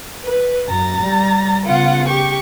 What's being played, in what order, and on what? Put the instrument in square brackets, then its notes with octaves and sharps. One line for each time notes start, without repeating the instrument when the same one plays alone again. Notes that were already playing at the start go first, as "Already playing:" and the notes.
[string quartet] B4
[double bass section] F#2 [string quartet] A#5 A6
[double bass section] G3
[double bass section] C#3 [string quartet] B3 F4 F#5
[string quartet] G4 C#6